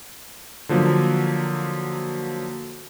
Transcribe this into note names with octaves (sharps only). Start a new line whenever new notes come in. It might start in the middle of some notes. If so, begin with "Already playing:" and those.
D3 F3 F#3 A#3